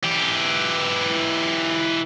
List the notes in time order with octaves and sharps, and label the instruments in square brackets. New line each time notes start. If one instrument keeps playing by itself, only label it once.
[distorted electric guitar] E3 G4